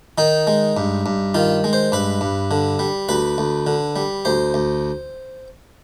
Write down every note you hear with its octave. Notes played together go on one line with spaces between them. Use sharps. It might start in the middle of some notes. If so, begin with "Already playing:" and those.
D#3 D#4
G#3
G2
G2
D#3 F4
G#3
C5
G2 B4
G2
D3
G3
D2 B4
D2
D3
G3
D2 C5
D2